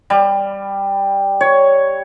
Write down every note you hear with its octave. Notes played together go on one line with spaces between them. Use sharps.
G3
C#5